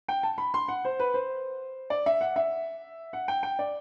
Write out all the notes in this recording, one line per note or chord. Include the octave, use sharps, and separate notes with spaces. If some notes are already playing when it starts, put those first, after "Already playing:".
G5
A5
B5
C6
F#5
C5
B4
C5
D5
E5
F#5
E5
F#5
G5
G5
D5